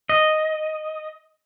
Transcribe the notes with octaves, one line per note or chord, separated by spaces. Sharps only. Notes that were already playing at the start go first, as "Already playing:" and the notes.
D#5